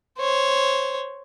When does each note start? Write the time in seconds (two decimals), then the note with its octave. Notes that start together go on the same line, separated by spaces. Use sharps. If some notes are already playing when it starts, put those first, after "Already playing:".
0.19 C5 C#5